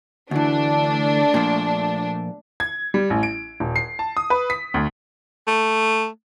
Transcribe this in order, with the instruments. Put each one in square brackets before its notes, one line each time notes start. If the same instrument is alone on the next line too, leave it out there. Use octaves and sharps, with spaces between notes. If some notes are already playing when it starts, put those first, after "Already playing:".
[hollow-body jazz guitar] D2 E3 [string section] A3 D4
[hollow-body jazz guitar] A#2 F3
[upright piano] G#6
G3
A1
D7
D#1
C7
A5
D#6
B4
B6
D2
[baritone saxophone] A3